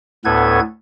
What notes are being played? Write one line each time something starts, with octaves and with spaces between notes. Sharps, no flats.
D2 A2 B3 A4 B4 G#6